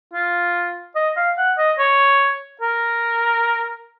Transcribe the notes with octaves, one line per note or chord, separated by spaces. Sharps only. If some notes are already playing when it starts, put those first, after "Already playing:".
F4
D#5
F5
F#5
D#5
C#5
A#4